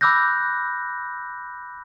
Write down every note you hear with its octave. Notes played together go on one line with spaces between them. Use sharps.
B5 D6 E6 F#6 G6 A#6